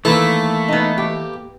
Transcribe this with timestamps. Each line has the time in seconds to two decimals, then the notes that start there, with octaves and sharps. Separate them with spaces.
0.05 D#3 E3 A3 A#3 E4 A4
0.68 B3 D#4
0.98 G4